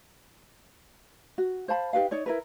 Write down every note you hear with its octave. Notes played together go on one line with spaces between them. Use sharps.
F#4
C5 F5 A5 B5
D#4 G4 B4 F5
D#4 C#5 D5
E4 A#4 B4